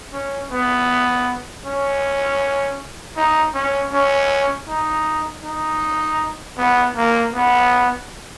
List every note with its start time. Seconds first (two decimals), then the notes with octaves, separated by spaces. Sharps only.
0.13 C#4
0.52 B3
1.66 C#4
3.17 D#4
3.55 C#4
3.93 C#4
4.69 D#4
5.44 D#4
6.58 B3
6.96 A#3
7.34 B3